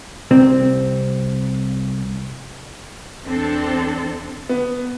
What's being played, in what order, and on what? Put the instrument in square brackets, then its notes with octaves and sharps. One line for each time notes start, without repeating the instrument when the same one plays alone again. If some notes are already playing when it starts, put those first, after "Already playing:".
[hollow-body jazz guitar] C2 C4
[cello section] E2 C4 D4 A4 C5
[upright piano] B3